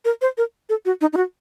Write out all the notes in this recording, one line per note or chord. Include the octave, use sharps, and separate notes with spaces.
A#4
C5
A#4
A4
F#4
D#4
D#4
F#4